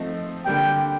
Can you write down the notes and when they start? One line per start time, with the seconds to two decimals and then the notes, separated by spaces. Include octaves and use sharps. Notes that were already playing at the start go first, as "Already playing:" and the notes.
Already playing: F3 A3 C4 D#4
0.45 D3 G3 A#3 G5